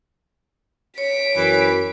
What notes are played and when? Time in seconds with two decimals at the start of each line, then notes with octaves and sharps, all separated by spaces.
0.98 C#5 B6 D7
1.36 F#2 E3